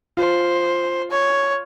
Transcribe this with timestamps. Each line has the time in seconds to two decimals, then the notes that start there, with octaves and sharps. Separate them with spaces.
0.17 F4 C5
1.10 C#5